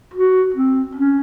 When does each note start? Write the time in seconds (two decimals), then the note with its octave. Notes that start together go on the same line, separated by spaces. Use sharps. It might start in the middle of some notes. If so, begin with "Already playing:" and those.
0.14 F#4
0.54 C4
0.96 C#4